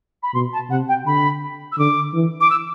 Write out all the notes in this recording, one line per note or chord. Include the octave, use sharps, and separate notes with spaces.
B5
B2 C6
A5
C3 F#5
G5
D3 B5
E6
D3 D6
E3
D6
E6